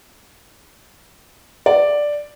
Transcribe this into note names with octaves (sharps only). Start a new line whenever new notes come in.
D5